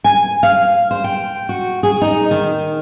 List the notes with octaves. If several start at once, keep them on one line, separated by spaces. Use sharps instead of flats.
G#5
F5
C5
G5
F#4
G#4
D#4
D#3